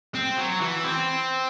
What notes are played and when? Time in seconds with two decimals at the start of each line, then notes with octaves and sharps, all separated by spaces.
0.15 C4
0.38 F#3
0.61 E3
0.84 C4